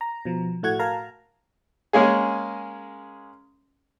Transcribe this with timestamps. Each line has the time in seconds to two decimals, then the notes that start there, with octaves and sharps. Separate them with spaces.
0.01 A#5
0.25 B2 F3
0.63 A2 A3 F#4 F#5 G#6
0.79 A#4 F5 A5 A#5
1.93 G#3 A#3 C#4 G#4